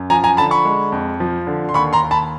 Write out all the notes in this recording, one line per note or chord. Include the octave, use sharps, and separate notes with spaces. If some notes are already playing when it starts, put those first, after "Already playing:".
Already playing: F#2
F3 G#5 A#5
G#5 A#5
D3 A5 B5
B5 C#6
G#3
F2
F3
D3
C6
D#2 B5 C#6
A#5 C6
D#2
A5 B5